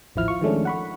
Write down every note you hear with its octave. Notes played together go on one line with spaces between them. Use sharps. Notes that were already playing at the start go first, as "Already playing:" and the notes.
A1 D#2 F3 E4 F6
F4 C#6
D#3 F3 G#3 A3 C#4 D4
F#5 B5 C#6